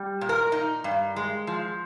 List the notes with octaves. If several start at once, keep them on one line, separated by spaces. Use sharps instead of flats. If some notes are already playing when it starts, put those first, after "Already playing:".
Already playing: G3
A#2
A#4
D#4
G2
G#3
F3